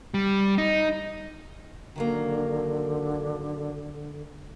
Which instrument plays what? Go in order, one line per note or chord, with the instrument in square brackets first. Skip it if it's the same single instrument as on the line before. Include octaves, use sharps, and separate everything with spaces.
[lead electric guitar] G3
D#4
[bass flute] D3 [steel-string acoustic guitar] D#3 F#3 A#3